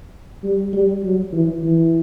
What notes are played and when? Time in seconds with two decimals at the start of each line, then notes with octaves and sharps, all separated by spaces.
0.44 G3
0.73 G3
1.03 F#3
1.33 E3
1.63 E3